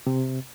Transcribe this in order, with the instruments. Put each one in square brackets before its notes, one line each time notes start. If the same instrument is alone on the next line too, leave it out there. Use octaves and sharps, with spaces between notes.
[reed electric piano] C3